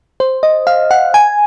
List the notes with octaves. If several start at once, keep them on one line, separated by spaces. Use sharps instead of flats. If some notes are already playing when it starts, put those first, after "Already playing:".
C5
D#5
F5
F#5
G#5